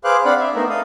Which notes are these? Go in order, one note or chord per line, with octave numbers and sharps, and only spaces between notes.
G#4 B4 C5 F5 D6 F#6
C4 D4 D5 F5 F#5 B5
E5
A3 B3 D#4 A#4
A4 F5 D#6